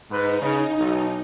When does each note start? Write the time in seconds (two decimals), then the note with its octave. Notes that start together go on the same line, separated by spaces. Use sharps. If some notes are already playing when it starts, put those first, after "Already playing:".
0.11 G#2 D#4 B4
0.42 C#3
0.79 B1